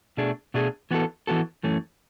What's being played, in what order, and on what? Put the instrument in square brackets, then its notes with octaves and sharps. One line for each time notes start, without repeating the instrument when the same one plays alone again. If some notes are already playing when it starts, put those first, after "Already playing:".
[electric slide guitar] B2 A3 D4 G#4
B2 A3 D4 G#4
E3 B3 F#4 A4
E3 B3 F#4 A4
F#2 E3 A3 C#4